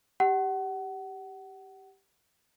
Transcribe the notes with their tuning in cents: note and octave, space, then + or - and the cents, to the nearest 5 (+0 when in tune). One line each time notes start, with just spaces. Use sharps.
G4 +0 F#5 +30